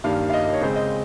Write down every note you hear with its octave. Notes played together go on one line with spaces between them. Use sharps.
G2 D#3 G3 A#3 F5
F5
D#5
D#5
C#5
C#3 G#3 C4 C5
D#5